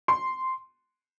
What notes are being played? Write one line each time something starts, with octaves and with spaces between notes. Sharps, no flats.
C6